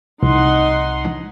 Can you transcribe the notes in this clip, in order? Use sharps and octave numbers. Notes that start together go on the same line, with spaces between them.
C2 D#4 F#5 C6